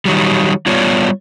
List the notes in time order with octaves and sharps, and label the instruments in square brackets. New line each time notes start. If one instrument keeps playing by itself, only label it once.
[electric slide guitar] D#3 F#3 G3
G3 B3 F4 C#5 D5